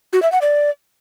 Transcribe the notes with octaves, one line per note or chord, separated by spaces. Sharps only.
F#4
E5
F#5
D5